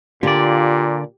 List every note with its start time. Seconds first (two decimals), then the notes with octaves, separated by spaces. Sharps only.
0.23 A#2 D3 F4 G4 D5